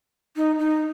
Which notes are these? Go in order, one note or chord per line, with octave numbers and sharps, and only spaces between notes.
D#4
D#4